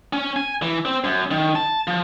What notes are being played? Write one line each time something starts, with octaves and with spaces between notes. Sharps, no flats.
C#4
G#5
E3
C4
F#2
D#3
A5
F3